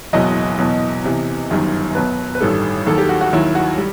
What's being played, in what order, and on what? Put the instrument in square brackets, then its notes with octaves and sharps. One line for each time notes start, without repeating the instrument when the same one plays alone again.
[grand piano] F#1 E2 B2 F#3 D#5
E2 B2 F#3
E2 C3 E3
G1 F#2 D#3 G3
B1 B2 F#3 B4
B4
A1 G2 D#3 G3 A4
D#2 D#3 F#3 A4
G4
F#4
F#4
D#2 D#3 F#3 E4
F#4
G3